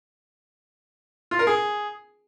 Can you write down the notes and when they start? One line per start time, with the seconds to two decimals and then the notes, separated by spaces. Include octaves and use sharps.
1.31 F4
1.39 A#4
1.47 G#4